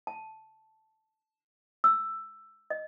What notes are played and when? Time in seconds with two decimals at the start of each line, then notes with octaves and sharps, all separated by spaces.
0.07 A5
1.84 E6
2.70 D#5